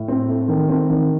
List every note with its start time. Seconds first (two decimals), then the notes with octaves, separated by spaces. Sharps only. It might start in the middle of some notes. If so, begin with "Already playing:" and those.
Already playing: A2
0.08 C4
0.29 A3
0.48 D#3
0.69 C4
0.90 D#3